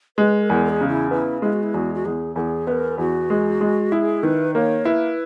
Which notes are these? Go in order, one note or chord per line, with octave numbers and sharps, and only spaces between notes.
G#3 B4
A#4
E2
A#4
G#4
C#3
E4
B3 E4
G#3 E4
F#4
E4
E2 F#4
F#4
E2 G#4
E2 G#4 A#4
B3 A#4 B4
E2 F#4
G#3
G#3
E4 G#4
D#3 B4
A#3 C#5
E4 B4